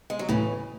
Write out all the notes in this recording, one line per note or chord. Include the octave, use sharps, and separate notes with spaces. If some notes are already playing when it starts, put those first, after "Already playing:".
G#3
F#3
A2 C#3 E3